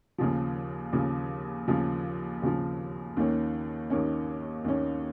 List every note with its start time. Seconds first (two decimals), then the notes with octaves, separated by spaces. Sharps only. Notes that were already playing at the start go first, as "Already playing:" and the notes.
0.18 D#2 C#3 F3
0.92 D#2 C#3 F3
1.68 D#2 C#3 F3
2.42 D#2 C#3 F3
3.16 D#2 D#3 A#3 C#4
3.90 D#2 D#3 A#3 C#4
4.64 D#2 D#3 A#3 C#4